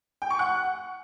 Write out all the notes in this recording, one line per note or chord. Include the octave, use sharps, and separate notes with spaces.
G5
C#6
F#5